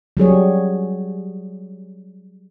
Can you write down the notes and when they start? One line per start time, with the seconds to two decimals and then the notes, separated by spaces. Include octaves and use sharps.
0.17 F#3 G3 G#4 C#5